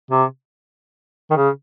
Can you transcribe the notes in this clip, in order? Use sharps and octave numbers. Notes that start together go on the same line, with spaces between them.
C3
D#3
C#3